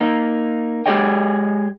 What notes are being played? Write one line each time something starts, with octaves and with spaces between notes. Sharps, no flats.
A#3 D#4
G#3 G4 G#4 C#5 D#5 G5